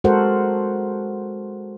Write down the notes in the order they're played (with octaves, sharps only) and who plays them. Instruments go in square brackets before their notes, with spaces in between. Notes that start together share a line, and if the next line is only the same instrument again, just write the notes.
[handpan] G#3 F#4 A4 A#4 C5 F#5